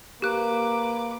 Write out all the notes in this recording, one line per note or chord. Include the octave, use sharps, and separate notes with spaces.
A#3 G4 B4 D6 F#6